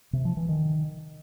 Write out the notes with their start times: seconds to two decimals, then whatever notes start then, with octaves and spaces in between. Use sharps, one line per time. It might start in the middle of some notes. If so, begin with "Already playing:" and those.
0.13 C3
0.25 F3
0.37 E3
0.49 D#3